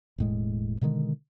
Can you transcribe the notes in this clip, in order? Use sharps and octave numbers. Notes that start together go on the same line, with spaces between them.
E1 A2 G#3
B2 D3 D#3 G#3